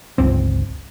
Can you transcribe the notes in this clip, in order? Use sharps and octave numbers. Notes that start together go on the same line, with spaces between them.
G1 C#2 C4